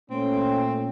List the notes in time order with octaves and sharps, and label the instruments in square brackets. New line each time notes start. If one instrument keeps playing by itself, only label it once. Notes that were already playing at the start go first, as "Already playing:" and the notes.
[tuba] A#2 [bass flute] A3 [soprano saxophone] C4 [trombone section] C#4